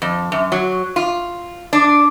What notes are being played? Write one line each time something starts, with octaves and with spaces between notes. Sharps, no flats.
F2
F#2
F#3
F4
D4